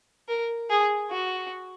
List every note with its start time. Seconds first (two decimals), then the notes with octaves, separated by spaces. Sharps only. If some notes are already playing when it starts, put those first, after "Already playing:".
0.28 A#4
0.70 G#4
1.11 F#4